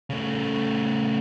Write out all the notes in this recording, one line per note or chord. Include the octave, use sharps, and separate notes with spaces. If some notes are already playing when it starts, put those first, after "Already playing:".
C#3 A3